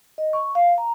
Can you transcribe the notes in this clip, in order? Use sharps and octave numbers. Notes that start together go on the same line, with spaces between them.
D#5
C#6
F5
A#5